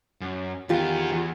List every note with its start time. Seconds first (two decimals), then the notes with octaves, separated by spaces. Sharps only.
0.21 F#2
0.69 E2 D#3 B3 F4 G4
1.12 E2